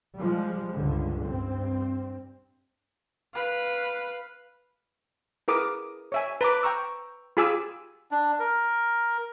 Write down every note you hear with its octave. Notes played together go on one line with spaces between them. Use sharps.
F3 G3 G#3
C#2 G2 D3
G2 C4
B4 F5
E4 G#4 A#4 B4 D6 D#6
C#5 E5 G#5
B4 A#5 D6
G5 A#5 C#6 E6
F4 G4 G#4 G#5 D6 E6
D4
A#4